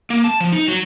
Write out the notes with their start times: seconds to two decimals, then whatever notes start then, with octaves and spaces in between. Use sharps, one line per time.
0.10 A#3
0.24 A5
0.40 F3
0.52 D#4
0.68 F#3